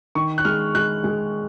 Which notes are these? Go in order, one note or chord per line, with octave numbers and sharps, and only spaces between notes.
D#3 C#6
F#6
G#3 F6
G#3 F#6
G#3